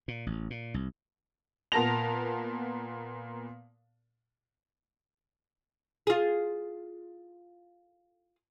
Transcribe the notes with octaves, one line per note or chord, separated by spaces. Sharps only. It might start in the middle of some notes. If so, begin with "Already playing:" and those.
A#2
A1
A#2
C2
A#2 B3 A#4 A5 A#6 F7
F4 G#4